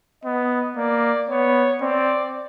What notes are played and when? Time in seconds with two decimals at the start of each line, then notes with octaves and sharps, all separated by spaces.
0.24 B3 D#5
0.76 A#3 D5
1.29 B3 C#5
1.81 C4 D5